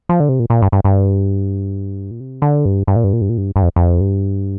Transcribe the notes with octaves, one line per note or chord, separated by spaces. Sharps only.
F3
D3
C3
A#2
A#2
G2
G2
G2
A#2
C3
D3
G2
G2
A#2
G2
A#2
G2
A#2
G2
G2
F2
F2
G2